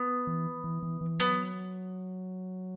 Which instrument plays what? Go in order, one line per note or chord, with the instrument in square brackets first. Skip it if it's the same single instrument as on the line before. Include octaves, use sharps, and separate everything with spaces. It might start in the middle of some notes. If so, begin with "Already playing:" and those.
Already playing: [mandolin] B3
[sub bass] E3
E3
E3
E3
[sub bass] F#3 [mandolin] B3